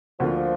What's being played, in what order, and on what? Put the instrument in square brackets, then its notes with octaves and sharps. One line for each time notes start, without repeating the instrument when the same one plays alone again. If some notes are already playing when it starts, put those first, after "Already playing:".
[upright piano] D2 D3 A#3 F4 [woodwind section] F3